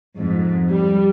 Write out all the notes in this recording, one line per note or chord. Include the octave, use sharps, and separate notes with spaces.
F2 G#2
G3